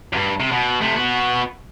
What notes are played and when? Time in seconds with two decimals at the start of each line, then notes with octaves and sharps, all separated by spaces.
0.13 E2 G2
0.40 C3
0.52 B2
0.81 C3 A3
0.96 B3 F#4